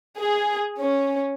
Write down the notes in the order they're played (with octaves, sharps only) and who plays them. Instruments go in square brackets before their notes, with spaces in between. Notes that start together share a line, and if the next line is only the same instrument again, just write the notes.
[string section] G#4
C#4